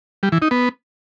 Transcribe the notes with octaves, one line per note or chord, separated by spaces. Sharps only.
G3
E3
D#4
B3